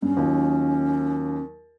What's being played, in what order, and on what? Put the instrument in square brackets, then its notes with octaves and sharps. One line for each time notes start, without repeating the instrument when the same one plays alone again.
[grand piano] G2 [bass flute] C#4
[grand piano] D#2 F#3 F4